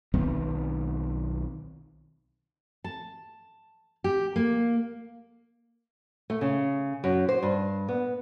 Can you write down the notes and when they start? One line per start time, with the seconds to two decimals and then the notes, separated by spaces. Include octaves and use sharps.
0.14 B1 D#3 B3 C4
2.84 A5
4.04 G4
4.36 A#3
6.30 A3
6.41 C#3
7.04 F#2
7.29 C5
7.42 G2
7.88 B3